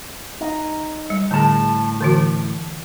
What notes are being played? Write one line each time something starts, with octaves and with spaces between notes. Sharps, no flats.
D#4
G3
A2 D3 G#4 A5
D3 E3 F#4